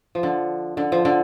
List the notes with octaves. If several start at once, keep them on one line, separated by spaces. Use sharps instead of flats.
F3
D3
D3
F3
D3